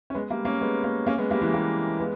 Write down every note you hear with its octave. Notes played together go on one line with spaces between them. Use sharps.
C#4
G#3 B3
G3 A#3
A#3 C#4
G#3 B3
A#3 C#4
A#3 C#4
G#3 B3
G3 A#3
E3 G#3
G3 A#3
G#3 B3